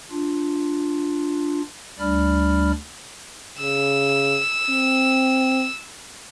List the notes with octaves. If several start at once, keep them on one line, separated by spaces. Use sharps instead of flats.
D4 F4
D2 G3 D4 D5 B5 F6
C#3 E6
C4